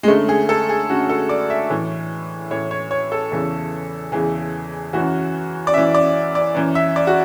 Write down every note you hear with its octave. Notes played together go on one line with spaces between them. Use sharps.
G#3
F#2 D3 A3
G#4
A4
G#4
F#2 D3 F#4
A4
D5
E5
A2 E3
A2 E3 C#5
C#5
C#5
A4
E2 C#3 E3
E2 C#3 E3 G#4
F#2 E3 F#4
D5
F#2 E3 E5
D5
D5
F#2 E3
E5
D5
F#4